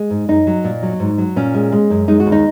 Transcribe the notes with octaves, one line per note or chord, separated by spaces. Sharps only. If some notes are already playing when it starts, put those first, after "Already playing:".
Already playing: G#3
G#2
F#2 D#4
F#3
A#2
F#3
G#2
F#3
A#2 C#4
G#3
G#3
F#2
G#3 D#4
F#4
D#2
D#4